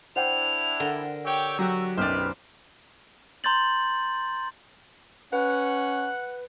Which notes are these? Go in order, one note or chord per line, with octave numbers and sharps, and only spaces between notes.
D4 E4 C5 F#5 G5 F7
D3 A#4
G4 C#5 G5 E6
F#3 F#4 G4
B1 F#2 G4 B4 C5 D5 F6
A#5 C6 G6 A6 F#7
C#4 B4 F#5